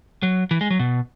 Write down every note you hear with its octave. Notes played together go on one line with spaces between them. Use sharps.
F#3
E3
G#3
F#3
B2